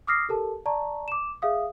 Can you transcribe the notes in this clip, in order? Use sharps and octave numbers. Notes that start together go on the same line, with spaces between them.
D6 D#6 F6 A#6 C7
G4 A4 A#4 A5
D5 A5 A#5 C#6
D6 E7
G#4 E5 F5 D#6